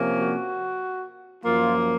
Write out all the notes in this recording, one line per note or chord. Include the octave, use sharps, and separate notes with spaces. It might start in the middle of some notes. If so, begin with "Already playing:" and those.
Already playing: C3 F3 A#3 C#4
F#4
F#2 F3 A#3 F4